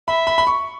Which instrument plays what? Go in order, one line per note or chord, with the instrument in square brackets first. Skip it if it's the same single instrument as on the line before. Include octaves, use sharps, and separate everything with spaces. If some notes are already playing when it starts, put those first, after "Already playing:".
[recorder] E5 [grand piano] B5
[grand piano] B5
B5
C#6